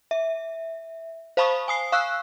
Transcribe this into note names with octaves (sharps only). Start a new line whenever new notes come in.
E5
C5 F5 A5 B5 C#6 D#6
G#5 D#6 C7
F5 C#6 E6 F#6